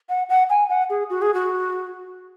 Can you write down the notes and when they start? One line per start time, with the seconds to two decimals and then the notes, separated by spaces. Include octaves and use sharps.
0.09 F#5
0.29 F#5
0.50 G#5
0.70 F#5
0.90 G#4
1.10 F#4
1.22 G#4
1.34 F#4